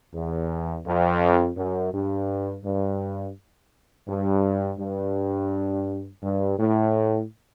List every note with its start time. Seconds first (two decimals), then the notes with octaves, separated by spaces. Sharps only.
0.15 E2
0.86 F2
1.57 F#2
1.93 G2
2.65 G2
4.08 G2
4.79 G2
6.23 G2
6.59 A2